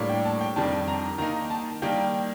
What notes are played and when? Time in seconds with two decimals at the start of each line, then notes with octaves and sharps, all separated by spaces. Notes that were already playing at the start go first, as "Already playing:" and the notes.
Already playing: A2 G3 A#3 D4
0.09 G5
0.25 A5
0.41 G5
0.56 F2 D#3 G3 D4 A5
0.88 A#5
1.18 D#3 A#3 D#4 A#5
1.50 A5
1.82 D#3 G3 A#3 G5